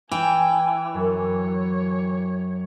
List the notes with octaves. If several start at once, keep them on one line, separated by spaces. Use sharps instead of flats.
E3 G5 G#5
F#2 C#5